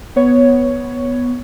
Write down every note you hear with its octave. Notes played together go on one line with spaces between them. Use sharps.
B3 C#5